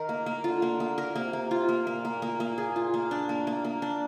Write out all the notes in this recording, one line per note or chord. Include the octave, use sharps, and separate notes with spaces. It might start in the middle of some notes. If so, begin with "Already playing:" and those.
Already playing: D#3 A#4
A#3
A#3
D3 F4
A#3
A#3
A#4
C3 A#3
A#3
F4
A#3
A#2 A#3
A#3
A#3
A#3
G#4
F4
A#3
D4
A#3
A#3
A#3
D4